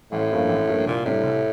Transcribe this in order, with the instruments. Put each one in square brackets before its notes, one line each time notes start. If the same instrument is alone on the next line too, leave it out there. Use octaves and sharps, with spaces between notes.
[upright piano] A1 [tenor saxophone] A2
[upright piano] G2 F3 A#3 E4
A1
G2 F3 A#3 E4
[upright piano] C2 [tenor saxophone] A#2
[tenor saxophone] A2 [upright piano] C3 G3 D4
[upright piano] C2